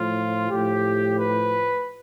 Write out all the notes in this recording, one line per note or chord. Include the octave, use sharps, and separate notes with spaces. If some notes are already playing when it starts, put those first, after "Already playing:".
Already playing: A2 F3 F4
A2 F3 G4
B4